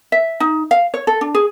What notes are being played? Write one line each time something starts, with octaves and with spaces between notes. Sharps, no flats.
E5
D#4
F5
C#5
A4
D4
G#4